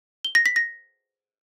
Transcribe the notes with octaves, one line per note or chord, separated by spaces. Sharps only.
G7
A#6
B6
A#6